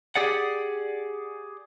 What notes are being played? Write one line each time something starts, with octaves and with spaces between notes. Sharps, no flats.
G4 G#4 D5 F#5